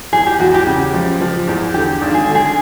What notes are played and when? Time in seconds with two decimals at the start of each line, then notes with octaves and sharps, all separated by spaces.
0.12 E2 G#4
0.26 G4
0.40 E2 F#4
0.54 G4
0.67 C#3
0.94 F3
1.21 F3
1.48 E2
1.74 D3 G4
2.01 G#1
2.14 G#4
2.28 D3
2.35 G#4